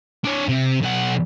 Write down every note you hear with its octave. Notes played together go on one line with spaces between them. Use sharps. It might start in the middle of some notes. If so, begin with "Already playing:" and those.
D4 C#5
C3
B1 F#5